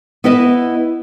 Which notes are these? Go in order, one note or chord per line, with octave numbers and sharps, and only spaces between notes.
B3 E4 B4 D#5 E5